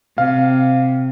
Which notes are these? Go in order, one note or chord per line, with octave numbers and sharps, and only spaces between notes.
C3 F5